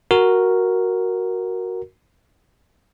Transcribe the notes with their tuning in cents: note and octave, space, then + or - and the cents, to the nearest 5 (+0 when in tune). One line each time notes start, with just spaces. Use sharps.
F#4 +0 A#4 +0